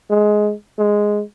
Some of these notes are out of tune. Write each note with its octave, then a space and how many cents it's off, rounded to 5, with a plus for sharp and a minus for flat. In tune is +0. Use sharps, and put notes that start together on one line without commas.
G#3 +15
G#3 +0